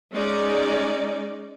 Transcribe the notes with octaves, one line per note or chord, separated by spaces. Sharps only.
G#3 C#4 D#4 D5